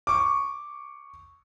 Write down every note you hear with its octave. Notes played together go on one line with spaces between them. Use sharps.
C#6 D6